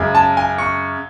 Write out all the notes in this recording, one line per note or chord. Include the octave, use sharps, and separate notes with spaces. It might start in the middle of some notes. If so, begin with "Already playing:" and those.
Already playing: F#2 C#3 G#3
A5
G#5
C#6